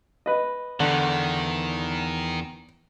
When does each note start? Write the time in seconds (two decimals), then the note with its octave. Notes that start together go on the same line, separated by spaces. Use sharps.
0.26 B4 D#5
0.80 E2 D3 D#3